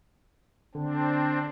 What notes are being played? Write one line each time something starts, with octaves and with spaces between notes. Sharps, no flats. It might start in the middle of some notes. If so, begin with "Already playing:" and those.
D3 C4 D4